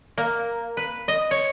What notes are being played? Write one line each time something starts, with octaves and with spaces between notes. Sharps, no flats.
A#3
B4
D#5
C#5